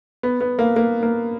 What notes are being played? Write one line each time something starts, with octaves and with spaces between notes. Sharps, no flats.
B3
B3
A#3
A#3
A#3